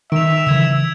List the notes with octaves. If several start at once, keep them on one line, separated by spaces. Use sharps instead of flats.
D#3 E5 D7 F7
C#3 E3 E6 G#6 E7